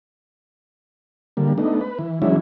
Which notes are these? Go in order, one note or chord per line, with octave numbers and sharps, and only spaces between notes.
D3 G3 A#3
A3 B3 D4 D#4
B4
E3
E3 F#3 G#3 C#4 D4 E4